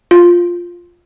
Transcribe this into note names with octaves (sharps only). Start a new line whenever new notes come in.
F4